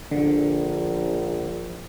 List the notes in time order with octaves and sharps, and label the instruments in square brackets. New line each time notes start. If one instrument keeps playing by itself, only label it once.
[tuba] A#1 [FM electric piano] D3